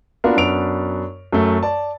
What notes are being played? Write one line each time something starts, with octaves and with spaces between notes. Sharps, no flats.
A#3 B3 D4 F4 F#4 A#4
F#2 B3 D4 D7 F7
F#2 A3
D5 A5